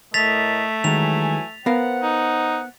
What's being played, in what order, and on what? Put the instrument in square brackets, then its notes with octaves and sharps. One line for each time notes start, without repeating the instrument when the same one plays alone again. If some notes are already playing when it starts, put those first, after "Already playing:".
[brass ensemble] A2 A#4 D#5 [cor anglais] A3 [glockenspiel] A6 B6 F7
[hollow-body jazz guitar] D#3 G#3 [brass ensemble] E3 F#3 G#5 [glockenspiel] F7
[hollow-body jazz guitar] B3 A#4 F5 [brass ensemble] C5 F#5
[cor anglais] D#4